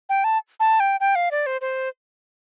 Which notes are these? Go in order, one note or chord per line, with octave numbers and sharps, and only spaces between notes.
G5
A5
A5
G5
G5
F5
D5
C5
C5